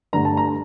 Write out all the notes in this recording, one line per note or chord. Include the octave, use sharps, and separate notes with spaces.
G2 D3 A3 A#5
A5
A#5